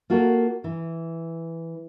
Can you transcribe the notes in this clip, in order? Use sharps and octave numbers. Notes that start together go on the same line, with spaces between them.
A#3 F4 F#4 A4 A#4
E3